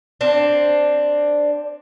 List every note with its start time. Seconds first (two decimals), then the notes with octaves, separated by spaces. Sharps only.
0.21 C4 D4